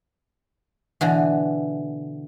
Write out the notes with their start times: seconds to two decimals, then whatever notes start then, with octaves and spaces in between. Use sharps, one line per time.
1.01 B2 D3 E3